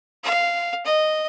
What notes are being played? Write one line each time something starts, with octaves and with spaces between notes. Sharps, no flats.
F5
D#5